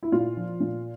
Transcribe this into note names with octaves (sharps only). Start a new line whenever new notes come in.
E4
A#2 F4
F3
A#2